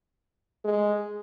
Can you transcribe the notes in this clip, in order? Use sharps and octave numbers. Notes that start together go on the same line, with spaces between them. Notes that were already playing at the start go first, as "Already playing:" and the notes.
G#3